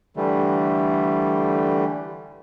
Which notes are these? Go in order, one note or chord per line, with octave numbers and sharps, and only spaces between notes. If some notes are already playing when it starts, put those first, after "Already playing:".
D3 E3 G3 A3